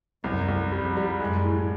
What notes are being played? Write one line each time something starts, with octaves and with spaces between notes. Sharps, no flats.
C2 F#2
C2
F2 G3
G3
F#2 G#3
A2